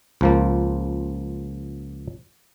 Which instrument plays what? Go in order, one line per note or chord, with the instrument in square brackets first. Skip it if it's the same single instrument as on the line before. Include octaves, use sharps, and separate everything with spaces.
[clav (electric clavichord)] C#2 F3 A#3